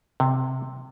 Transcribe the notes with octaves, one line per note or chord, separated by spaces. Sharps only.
C3